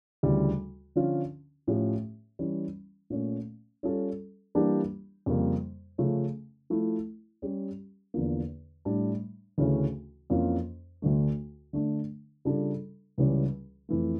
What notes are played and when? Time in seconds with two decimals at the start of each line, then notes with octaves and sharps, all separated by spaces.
0.23 D2 C#3 E3 G3
0.96 D3 F3 C#4 F4
1.67 A2 F3 C#4 G4
2.39 E3 G3 C#4
3.10 A#2 A3 C#4
3.83 G3 C#4 F4 A4
4.55 E3 G3 A#3 D4 G4
5.26 F2 C#3 G3 A#3
5.98 C#3 F3 A3 C#4
6.70 F3 A3 E4
7.42 G3 C#4 G4
8.14 E2 D3 F3 A#3
8.85 A2 G3 D4
9.58 D2 C#3 E3 A3 C#4
10.30 F2 E3 A#3 C#4 F4
11.02 D2 D3 A3
11.73 D3 A3 D4
12.45 C#3 G3 D4 F4 A4
13.18 C#2 C#3 E3 G3 C#4
13.89 F2 E3 A3